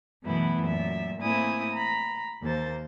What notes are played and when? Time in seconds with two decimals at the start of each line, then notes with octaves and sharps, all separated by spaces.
0.23 F#2 B2 E3 A3 B3 E4
0.61 F#2 A#2 E5
1.21 A2 A#3 C4 E4 G#5 D#6
1.73 A#5 B5
2.41 D#2 A#3 C5 A6